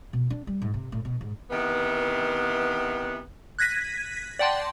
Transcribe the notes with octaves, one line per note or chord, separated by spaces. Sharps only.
B2
D4
G3
G#2
C3
A2
B2
G#2
C3 D#3 E3 B3
F#6 G#6 A#6 B6 D#7
D5 F#5 G5 A5 C6